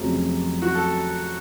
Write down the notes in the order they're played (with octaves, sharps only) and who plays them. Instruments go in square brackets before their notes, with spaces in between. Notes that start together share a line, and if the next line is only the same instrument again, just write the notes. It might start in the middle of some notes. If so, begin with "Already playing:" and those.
Already playing: [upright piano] F1 F2 C#3 F#3
[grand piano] F#4
A4